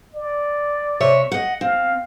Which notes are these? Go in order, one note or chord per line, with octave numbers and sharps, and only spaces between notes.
D5
C3 C#5 E5
D#5 F#5
C4 F5